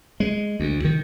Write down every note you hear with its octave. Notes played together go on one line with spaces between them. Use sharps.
G#3
D2
D#3